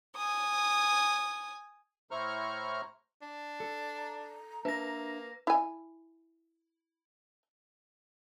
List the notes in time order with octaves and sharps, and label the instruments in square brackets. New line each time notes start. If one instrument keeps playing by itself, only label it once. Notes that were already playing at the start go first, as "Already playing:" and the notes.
[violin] G#5 D#6
[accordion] A2 E4 C5 A#5 C#6 F6
[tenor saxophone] D4
[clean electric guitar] A4
[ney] A#5
[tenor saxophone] A#3 [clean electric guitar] D4 E5 [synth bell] B4 A#6
[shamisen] E4 G#5